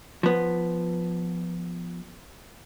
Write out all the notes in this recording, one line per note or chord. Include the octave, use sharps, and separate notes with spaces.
F3 B3